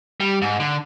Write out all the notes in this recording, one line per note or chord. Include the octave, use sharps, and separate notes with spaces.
G3
G#2
D3